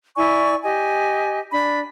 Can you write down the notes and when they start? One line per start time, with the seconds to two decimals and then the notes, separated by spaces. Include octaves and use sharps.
0.16 E4 D5 G#5 C#6
0.64 G4 D#5 G#5
1.51 D4 B5